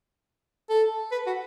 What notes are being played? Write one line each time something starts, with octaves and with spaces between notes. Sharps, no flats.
A4
B4
F#4